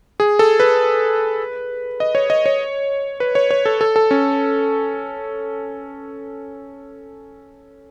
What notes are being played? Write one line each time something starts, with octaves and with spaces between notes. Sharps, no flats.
G#4
A4
B4
D#5
C#5
D#5
C#5
B4
C#5
C#5
A4
A4
A4
C#4